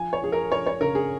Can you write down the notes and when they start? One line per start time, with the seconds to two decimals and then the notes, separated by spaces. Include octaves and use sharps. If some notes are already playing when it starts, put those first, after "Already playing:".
Already playing: F3 G#5
0.13 C#5
0.22 F3 G#4
0.32 A#4
0.51 F3 C#5
0.66 C#5
0.81 C#3 A#4
0.95 G#4